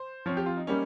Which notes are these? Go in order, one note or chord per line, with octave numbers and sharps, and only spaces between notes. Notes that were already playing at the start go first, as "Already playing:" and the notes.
Already playing: C5
F3 C4 C#5
G4
F4
D#4
G3 A#3 C#4